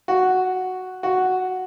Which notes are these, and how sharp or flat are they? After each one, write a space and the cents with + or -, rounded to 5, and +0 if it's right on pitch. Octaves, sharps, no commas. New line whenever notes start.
F#4 +0
F#4 +0